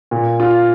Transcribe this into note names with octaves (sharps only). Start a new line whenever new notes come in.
A#2
F4